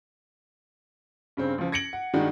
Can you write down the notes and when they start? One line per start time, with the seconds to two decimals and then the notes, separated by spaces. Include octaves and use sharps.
1.37 G2 C#3 C4
1.58 C#2 F3
1.72 G#6 A#6 C#7 D7 F#7
1.93 F#5
2.13 G2 D#3 G#3 D4 D#4 F#4